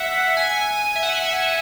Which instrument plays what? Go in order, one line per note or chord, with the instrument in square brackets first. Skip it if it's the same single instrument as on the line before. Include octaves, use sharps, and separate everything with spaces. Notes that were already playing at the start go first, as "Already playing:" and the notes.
Already playing: [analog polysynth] E5 F#5
G#5
E5
F#5
E5